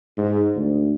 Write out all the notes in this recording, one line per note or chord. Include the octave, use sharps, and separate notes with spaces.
G#2
D2